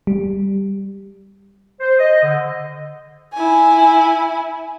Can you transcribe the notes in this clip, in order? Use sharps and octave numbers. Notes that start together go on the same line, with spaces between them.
G3
C5
D#5
D3
E4 G#5